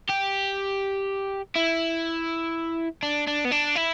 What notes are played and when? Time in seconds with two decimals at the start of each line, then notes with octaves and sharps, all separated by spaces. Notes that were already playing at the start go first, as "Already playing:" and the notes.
0.10 G4
1.56 E4
3.03 D4
3.28 D4
3.45 B3
3.52 D4
3.76 E4